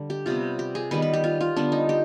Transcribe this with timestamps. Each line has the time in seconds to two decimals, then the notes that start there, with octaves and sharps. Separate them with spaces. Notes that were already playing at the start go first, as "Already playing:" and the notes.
Already playing: D3 G3
0.10 G4
0.26 C3 G3 B3 F4
0.59 G4
0.75 G#4
0.91 D#3 G3 B3 B4
1.02 B4
1.13 G4
1.24 F4
1.41 F4
1.56 D3 G3 B3 D4
1.72 D#4
1.89 G4